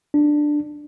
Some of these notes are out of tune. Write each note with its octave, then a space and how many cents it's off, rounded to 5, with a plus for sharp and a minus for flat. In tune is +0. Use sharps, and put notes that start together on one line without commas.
D4 +10